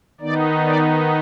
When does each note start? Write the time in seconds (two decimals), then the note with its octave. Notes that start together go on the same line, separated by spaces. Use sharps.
0.20 D#3 B3 D#4 D5
0.64 D5